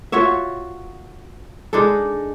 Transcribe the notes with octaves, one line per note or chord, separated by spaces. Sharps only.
F4 F#4 C#5 E5
G#3 D4 D#4 A4